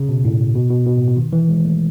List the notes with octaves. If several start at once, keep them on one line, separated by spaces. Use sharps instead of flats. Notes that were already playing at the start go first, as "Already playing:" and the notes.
Already playing: C#3
B2
A2
B2
B2
B2
A2
B2
D#3
E3
G#3
A3